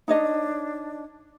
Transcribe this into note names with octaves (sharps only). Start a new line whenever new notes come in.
D4 D#4 C#5 D#5